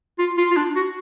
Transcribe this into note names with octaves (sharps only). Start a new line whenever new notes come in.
F4
F4
F4
D4
F#4